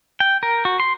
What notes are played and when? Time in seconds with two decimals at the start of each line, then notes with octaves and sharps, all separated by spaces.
0.20 G5
0.43 A#4
0.65 F#4
0.80 C6